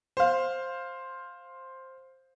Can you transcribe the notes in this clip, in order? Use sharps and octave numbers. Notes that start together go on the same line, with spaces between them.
C5 F5